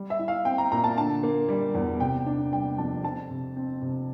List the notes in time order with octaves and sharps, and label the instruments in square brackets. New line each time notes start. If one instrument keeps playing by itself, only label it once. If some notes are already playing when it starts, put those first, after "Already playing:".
Already playing: [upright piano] G3
E5
E4
F5
C4 G5
A#5
A#2 A#5
A5
D3 A5
A#3
G3
E2
C3 G5
D4
G3 G5
F2 A5
F3 A5
C3
C4
C3